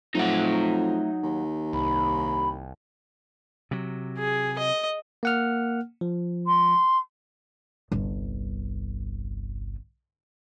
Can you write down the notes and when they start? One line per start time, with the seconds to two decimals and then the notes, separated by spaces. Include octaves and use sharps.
0.15 F2 F#3 A3 D#4 F#5
1.23 D#2
1.73 C2 B5
3.71 C3 F#3
4.18 G#4
4.59 D#5
5.23 A#3 F#5 F6
6.01 F3
6.46 C6
7.92 G1 C2